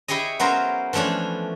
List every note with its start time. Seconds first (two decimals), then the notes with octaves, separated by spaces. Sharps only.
0.08 E4 G4 G#4 C#5 D#5
0.40 F#3 B3 C#4 A#4 C5
0.93 E3 F3 A3 C#4 D4